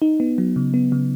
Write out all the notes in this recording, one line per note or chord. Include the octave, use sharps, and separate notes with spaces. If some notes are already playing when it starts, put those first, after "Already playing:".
D#4
B3
F#3
C#3
B3
C#3